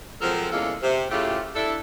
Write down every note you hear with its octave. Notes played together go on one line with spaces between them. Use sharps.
F3 F#3 G#3 C4 A4 A#4
E2 G#3 A#3 C#4 F4 A4
C3
A2 C#3 A3 F4 G4
D4 E4 A4